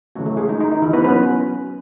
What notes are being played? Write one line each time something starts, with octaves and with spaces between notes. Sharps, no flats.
C#3 E3 F#3 A3 C#4 F#4
A3 A4
G#3 G#4
D#4
D#4
D#4
E3 E4
B3 B4
F#3 B3 C#4 B4